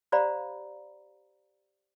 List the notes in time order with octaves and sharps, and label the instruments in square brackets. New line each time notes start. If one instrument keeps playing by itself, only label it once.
[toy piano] G4 C5 D5 F5 A#5 B5